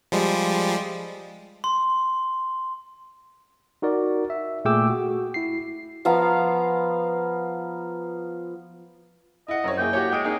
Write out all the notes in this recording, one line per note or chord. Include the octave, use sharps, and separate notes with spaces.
F3 G3 G#3
C6
D#4 F#4 A#4 D5
E5
A#2 A3 G#4 G5 D6 E6
F#4
E4 C7
F3 B3 F5 A#5
E4 D#5 F#5
F#2 C4 C#5
A#3 E4 G#4 G5
F#4 G4 C#5
G#3 G5 D#6 D7
A#3 D#4 G#4